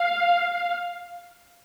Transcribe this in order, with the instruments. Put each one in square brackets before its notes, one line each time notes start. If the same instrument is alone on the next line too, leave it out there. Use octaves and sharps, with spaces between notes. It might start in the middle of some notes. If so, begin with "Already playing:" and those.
Already playing: [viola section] F5